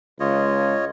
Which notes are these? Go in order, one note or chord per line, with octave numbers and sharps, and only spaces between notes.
C#2 F4 C#5 D#5